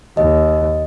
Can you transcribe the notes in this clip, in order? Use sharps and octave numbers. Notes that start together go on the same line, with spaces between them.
D#2 D#5